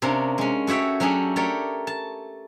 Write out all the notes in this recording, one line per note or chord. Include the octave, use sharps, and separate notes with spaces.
C3 A#3 C#4 D4
G#3 C#4
A3 F#4 C#5 E5 G5
F#3 A3 C#4 D4 G4 G#4
A3 G4 A#4 C#5 D5
A5